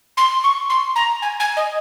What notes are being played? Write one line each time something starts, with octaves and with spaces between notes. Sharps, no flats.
C6
C#6
C6
A#5
G#5
G#5
D#5